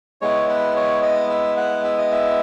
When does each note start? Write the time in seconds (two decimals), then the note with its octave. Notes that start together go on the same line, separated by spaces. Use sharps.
0.22 G#3 B3 E4 C#5
0.49 B4
0.76 C#5
1.02 D#5
1.30 E5
1.57 F#5
1.84 E5
1.98 D#5
2.11 E5